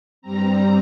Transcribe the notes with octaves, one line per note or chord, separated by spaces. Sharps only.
G2 G3 C4 A#5